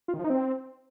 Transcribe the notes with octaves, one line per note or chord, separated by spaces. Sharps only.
F4
D#3
F3
D#4
C4